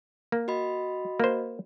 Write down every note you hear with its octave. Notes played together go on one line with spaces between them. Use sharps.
A#3
F#4 D#5 B5
A#3 C5